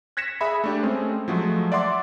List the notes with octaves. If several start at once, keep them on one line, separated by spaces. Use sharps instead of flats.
F#6 G#6 A#6 B6 C#7 E7
G#4 E5 B5
A3 D4 G4
G#3 A3 C4 C#4
F3 F#3 G#3 A3
D5 E5 F#5 C6 D6